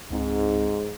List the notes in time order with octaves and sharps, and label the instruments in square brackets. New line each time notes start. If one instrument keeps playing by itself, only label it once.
[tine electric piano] C#2 C4 D#4 [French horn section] G#2